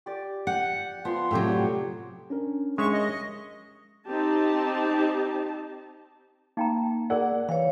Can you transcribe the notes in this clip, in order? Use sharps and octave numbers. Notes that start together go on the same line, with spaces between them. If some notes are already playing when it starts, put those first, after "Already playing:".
G4 D5
F#5 G5
F3 B3 F#5 C6
A2 C3 F#3 C4 G4 C#5
B3 G4 D5
C#4 D4 A#4
D#2 G#2 G#3 C#5 E5 C#6
D#5
C4 D#4 G4 A5
A#3 D#4 G5 A#5
G#4 A#4 D5 F#5
E3 C#5 F5